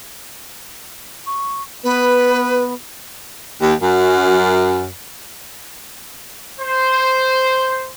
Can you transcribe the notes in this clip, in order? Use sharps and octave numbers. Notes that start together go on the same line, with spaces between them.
C#6
B3 B4
D#2
F#2
C5